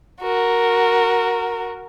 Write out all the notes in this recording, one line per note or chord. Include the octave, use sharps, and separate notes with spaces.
F#4 A#4